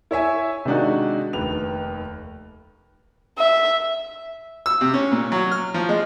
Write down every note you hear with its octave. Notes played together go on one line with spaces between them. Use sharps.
E4 C#5 E5 G#5
C3 D#3 G#3 D4 D#4 F#4
F1 D#2 B4 F7
E5
E6
C3
C#4
A#2
F#3
F6
F3
G#3